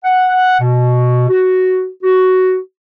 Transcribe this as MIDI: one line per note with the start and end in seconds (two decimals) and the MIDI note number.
0.05 0.59 78
0.60 1.28 47
1.29 1.88 66
2.03 2.58 66